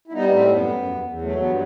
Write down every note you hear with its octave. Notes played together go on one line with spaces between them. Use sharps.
E4
G3 B3 D#4
A2 A3 C4
F#2 B3
F#2
E2
E2
F#3 A3
G2 B3